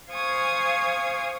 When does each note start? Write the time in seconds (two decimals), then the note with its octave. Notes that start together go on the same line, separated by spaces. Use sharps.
0.11 C5 F5 G#5 C#6 D#6 G#6